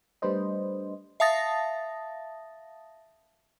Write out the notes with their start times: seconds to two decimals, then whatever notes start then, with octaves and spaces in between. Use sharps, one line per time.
0.22 G3 A3 D4 B4 C5 D#5
1.20 E5 F5 A5 D#6 A6 A#6